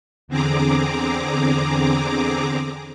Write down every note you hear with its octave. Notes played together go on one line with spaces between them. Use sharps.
E2 D3 C4 G#4 A#5 D6